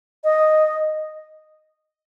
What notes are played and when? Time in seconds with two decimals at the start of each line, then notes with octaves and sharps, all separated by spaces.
0.24 D#5